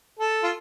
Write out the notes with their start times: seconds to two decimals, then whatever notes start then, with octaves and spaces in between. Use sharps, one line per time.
0.19 A4
0.43 F4